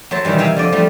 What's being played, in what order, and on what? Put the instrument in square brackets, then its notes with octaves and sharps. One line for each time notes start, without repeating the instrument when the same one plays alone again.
[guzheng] F#3 C5 E5 A5
B2 D#3 E3 G3
C3 E5 F5 G5 G#5 A#5
D3 F3 D5 D#5
F3 G3 A3 D#5